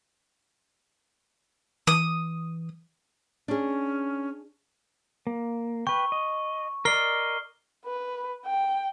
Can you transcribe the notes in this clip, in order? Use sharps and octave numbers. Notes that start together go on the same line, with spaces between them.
E3 D#6
C#4 D4 G#4
A#3
B4 G5 C#6
D#5
A#4 D5 D#5 F6 C7 G7
B4
G5